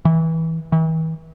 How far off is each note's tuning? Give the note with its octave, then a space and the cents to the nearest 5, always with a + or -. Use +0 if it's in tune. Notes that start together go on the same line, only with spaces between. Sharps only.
E3 -20
E3 -40